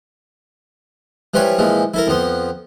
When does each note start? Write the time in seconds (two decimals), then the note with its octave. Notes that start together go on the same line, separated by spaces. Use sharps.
1.34 E3 F3 G3 F4 B4 C#5
1.58 A#2 E3 F3 G#3
1.94 E4 A4 A#4
2.07 F2 F3 B3 C6